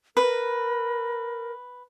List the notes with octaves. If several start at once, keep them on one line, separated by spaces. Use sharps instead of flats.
A#4 B4